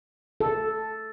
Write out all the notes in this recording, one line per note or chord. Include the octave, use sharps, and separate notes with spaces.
A4